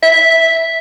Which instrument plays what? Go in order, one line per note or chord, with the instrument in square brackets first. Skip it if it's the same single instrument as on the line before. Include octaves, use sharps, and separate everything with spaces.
[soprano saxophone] E5